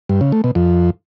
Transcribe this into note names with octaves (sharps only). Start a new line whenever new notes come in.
G2
C#3
A3
B2
F2